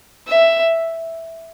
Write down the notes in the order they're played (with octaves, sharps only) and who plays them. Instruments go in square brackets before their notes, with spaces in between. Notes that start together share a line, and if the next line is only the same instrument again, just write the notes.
[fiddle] E5